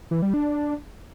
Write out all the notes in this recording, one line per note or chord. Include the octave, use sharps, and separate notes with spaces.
E3
G3
D4